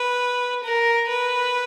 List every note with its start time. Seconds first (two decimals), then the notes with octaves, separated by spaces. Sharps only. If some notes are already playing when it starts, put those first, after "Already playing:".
Already playing: B4
0.63 A#4
1.09 B4